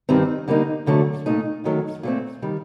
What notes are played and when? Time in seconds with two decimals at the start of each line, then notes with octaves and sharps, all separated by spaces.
0.09 G2 D#3 G3 C4 D#4
0.48 D3 G3 A#3 D#4
0.86 D2 D3 F#3 A3
1.26 A#2 A3 D#4
1.64 F#2 D#3 F#3 A3
2.03 A#2 A3 C4
2.42 D#3 G3